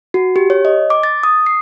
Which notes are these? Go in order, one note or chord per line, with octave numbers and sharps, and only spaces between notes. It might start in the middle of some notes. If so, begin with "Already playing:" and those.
F#4
G4
C#5
D#5
D6
A6
D#6
C7